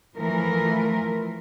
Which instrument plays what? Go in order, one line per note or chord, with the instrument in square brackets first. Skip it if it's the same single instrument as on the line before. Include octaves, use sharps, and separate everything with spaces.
[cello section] E3 F3 A3 A#4